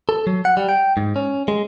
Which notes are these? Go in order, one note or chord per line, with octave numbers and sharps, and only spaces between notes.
A4
F#3
F#5
G3
G5
G#2
C#4
G#3